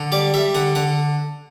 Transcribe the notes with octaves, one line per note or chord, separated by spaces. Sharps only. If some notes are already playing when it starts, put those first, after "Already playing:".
Already playing: D3
G3 D5
G3 E5
D3 F#5
D3 F#5